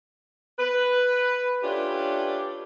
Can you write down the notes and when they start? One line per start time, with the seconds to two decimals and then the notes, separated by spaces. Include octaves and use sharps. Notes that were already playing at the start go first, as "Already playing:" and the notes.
0.58 B4
1.63 A3 C#4 D4 F4 G4 B4